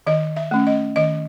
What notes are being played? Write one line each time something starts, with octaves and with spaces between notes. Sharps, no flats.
D#3 D#5
E5
A3 C#4
D#5
D#3 D#5